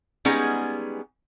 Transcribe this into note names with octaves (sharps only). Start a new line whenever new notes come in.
G3 G#3 B3 C#4 D#4 G#4